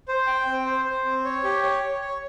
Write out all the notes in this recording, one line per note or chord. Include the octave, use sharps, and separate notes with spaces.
C5
G5
C4
C5
C5
C4
C#5
G4
C#5
C#5
C#5